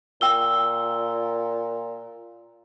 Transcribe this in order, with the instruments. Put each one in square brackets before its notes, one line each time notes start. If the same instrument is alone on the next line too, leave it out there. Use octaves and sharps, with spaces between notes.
[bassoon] A#2 [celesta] G5 E6 G7